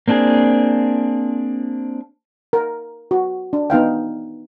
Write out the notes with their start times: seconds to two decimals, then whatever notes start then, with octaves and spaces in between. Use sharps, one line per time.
0.08 A#3 C4 D4 F#4 G#4
2.53 A#4
3.11 F#4
3.53 D4
3.70 B3 D#4 F5 G5